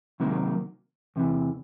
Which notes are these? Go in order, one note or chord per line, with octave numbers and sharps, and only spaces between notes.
C3 D#3 F#3 A#3
E2 C3 E3